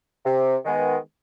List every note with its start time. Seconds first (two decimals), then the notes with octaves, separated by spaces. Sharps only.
0.25 C3
0.65 D#3 G#3 B3